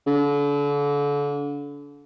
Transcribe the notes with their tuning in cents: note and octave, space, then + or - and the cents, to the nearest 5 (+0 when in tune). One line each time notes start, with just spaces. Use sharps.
D3 -35